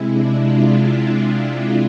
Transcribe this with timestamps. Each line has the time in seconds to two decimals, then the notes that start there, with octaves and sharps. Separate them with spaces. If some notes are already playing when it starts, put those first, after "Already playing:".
Already playing: C3 G#3 E4
0.11 D4
0.43 F4
1.08 E4